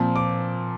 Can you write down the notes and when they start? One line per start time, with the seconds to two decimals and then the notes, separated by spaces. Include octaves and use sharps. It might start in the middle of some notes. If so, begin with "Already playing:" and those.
Already playing: A#2 F3 C4
0.16 D6